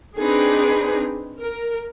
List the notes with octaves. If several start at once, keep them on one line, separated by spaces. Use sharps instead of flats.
C4 D4 D#4 G#4 B4
A#4